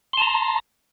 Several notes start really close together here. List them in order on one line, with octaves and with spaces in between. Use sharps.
C6 A5 A#5